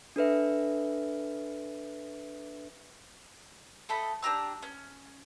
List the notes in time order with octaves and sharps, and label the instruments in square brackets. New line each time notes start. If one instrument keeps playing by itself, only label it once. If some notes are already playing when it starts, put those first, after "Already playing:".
[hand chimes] D4 A4 B4 E5
[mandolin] A3 A4 D#5 B5
D4 G4 A#5 E6
C#4